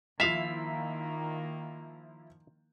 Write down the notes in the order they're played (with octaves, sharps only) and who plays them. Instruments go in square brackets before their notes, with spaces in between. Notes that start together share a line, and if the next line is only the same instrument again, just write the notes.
[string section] D#3 A#3 [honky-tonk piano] F3 E4 [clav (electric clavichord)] E5 F5 [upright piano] B6